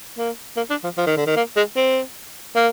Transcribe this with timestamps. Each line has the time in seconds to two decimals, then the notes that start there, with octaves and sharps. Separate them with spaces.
0.18 A#3
0.57 A#3
0.70 D4
0.84 F3
0.97 F3
1.06 D#3
1.17 D3
1.27 D#3
1.36 A#3
1.56 G#3
1.76 C4
2.55 A#3